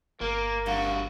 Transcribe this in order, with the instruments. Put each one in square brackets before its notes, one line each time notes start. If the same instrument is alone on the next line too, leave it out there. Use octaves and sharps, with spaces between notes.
[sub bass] G1 [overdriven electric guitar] A#3 [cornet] A#4
[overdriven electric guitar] G2 F#4 [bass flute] F5